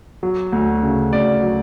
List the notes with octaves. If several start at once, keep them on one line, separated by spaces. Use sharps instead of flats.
F#3
D2
C#3
D2 D5
F#3